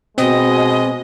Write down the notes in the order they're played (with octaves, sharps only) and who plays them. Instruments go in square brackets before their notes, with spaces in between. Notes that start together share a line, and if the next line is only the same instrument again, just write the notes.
[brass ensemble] B2 [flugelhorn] G#3 [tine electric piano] C4 [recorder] D#5